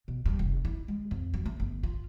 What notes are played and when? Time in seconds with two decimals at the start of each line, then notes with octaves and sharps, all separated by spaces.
0.08 B2
0.26 G2
0.39 F1
0.65 E4
0.88 G#3
1.11 F2
1.34 F#3
1.46 A3
1.60 G1
1.83 F4